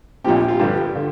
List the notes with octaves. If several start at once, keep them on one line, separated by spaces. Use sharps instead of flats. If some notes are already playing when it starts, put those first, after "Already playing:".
A#1 A#2 F3 C4 G4
G4
F4
G2 D3 F3 G4
D3